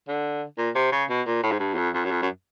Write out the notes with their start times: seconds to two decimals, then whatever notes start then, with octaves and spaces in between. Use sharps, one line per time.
0.08 D3
0.58 A#2
0.75 C3
0.92 C#3
1.10 B2
1.27 A#2
1.43 A2
1.52 G#2
1.60 G2
1.74 E2
1.77 F2
1.95 F2
2.05 F#2
2.11 F2
2.22 F#2